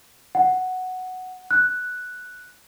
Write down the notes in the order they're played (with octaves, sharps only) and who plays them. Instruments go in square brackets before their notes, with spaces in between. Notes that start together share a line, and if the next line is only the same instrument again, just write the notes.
[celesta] F#5
F#6